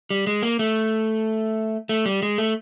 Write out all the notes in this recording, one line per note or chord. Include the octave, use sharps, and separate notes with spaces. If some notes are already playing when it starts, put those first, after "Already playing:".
G3
G#3
A#3
A3
A3
G3
G#3
A3